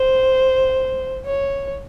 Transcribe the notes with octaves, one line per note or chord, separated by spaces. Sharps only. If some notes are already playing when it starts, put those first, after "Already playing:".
Already playing: C5
C#5